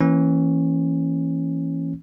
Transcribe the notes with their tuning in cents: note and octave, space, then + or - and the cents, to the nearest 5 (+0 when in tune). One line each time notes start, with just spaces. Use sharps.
E3 +0 A#3 -15 C#4 -20